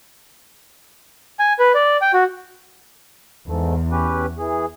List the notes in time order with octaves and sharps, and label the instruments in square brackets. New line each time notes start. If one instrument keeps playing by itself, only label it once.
[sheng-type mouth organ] G#5
B4
D5
G5
F#4
[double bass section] E2 [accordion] G#2 A3
[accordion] C#4 G4 B4
E3 G#4